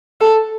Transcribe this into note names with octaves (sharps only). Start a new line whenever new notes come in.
A4